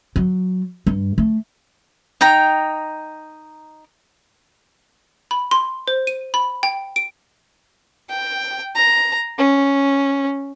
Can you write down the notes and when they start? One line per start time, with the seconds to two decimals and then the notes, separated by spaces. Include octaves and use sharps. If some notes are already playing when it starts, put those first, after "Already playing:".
0.16 F#3
0.87 G2
1.18 A3
2.21 D#4 G5 A#5
5.31 B5
5.51 C6
5.88 C5
6.07 D#7
6.34 B5
6.63 G5
6.96 D7
8.09 G5
8.75 A#5
9.38 C#4